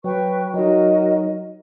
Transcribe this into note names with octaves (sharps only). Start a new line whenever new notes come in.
F#3 B4 G5 C#6
F#3 D#4 F#4 A#4 D#5